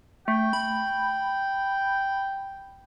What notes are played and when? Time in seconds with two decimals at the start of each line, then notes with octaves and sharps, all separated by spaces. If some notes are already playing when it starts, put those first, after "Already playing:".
0.28 A3 G5
0.53 B5